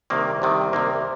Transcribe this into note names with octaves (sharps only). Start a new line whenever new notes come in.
C2 C3 D#3 A#3
C2 C3 D#3
C2 C3 D#3 A#3